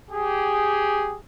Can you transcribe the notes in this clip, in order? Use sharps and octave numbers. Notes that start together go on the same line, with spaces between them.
G4 G#4